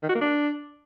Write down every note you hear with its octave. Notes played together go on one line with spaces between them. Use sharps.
D#3
F#4
A#3
D4